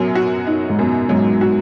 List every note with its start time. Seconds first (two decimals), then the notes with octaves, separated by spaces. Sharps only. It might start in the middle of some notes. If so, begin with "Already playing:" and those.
Already playing: F#2 B2 F#3
0.15 F#4
0.47 D#4
0.69 G#2
0.78 F#2 B2
1.09 G#2 F#3
1.41 F#4